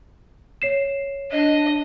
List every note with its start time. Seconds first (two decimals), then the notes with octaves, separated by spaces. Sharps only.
0.62 C#5 C7 E7
1.32 D4 D#5